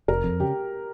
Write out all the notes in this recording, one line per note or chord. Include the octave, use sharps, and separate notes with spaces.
F1 A#4
F2
C#3 G4